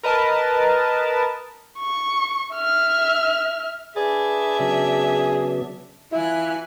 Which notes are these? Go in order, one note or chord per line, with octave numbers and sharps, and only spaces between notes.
A#4 B4 D#5 A5
C#6
E5 F6
D4 G#4 B4 D5 E5 A6
C#3 F#3 B3
E3 E4 F4 G#5 F#6